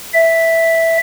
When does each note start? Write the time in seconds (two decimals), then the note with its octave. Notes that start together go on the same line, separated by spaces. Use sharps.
0.14 E5